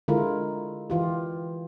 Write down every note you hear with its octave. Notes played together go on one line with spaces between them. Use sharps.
D3 G#3 E4 F4 A#4
E3 F4 G4